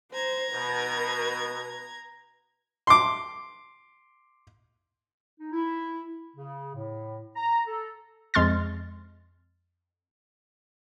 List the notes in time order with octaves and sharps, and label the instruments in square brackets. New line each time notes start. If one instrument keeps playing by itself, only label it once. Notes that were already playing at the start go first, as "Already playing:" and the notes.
[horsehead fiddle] C5 [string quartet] A#5 G#6
[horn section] B2 [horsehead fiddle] B4
[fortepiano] C6 D6
[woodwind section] D#4
E4
C#3
A2
A#5
A4
[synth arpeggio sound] F2 G#3 C6 F6 A6